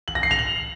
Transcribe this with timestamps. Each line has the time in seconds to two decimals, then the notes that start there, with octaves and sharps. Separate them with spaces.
0.08 F#7
0.15 A#6
0.23 C7
0.31 F7
0.39 F#7